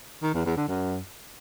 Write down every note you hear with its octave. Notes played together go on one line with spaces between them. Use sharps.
D#3
E2
E2
D3
F#2